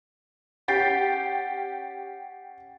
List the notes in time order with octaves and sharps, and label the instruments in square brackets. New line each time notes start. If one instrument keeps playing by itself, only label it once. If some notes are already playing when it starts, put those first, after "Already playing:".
[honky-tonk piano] C#4 G4 G5 [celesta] F#5 A6 C7